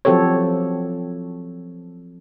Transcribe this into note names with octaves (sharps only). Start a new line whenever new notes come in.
F3 F#3 C4 G4 A4 C#5